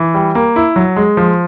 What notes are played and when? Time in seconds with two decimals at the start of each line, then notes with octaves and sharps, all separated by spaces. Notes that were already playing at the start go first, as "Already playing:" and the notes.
Already playing: E3
0.14 G3
0.35 A#3
0.56 E4
0.76 F#3
0.96 G#3
1.17 F3